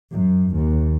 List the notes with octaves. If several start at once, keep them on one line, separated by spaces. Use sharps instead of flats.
F#2
D#2